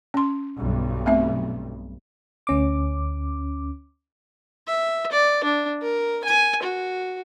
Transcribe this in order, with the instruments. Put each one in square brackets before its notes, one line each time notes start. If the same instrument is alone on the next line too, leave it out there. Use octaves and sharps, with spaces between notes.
[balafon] C#4 C6
[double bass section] B1 G2
[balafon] A3 C4 E5
[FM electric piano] D2 C#4 D6
[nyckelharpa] E5
D5
D4
A#4
G#5
F#4